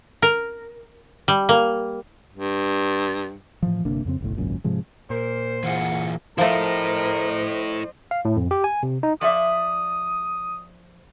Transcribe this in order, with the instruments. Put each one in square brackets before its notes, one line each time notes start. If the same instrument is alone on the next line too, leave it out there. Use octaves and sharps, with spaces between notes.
[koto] A#4
G3
A#3
[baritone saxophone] G2
[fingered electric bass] A2 E3 F3
G1 C3 A#3 D4
F2 C#3 C4
F#1 B1 A2
G#1 C#2 F#2 A#2
G#2 C3 F3 G#3
[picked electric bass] A#2 [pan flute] A#4 [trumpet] C5
[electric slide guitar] E3 F4 G#4 [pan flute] F#5
[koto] F3 A3 [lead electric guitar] E4 A4 [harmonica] A#4 [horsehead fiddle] C5 D#5
[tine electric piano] F5
A2
F2
G4
G#5
C3
D#4
[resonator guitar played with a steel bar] F3 D5 E5 [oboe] D#6